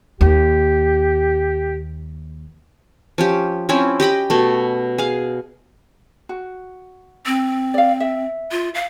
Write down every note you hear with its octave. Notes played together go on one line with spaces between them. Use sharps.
D#2 G4
F3 C#4 G4
F3 C4 C#4 E4
G4 D#5 G5 B5
B2 A3
G#4 F5
F#4
C4
D5 F5
E5
F4
F5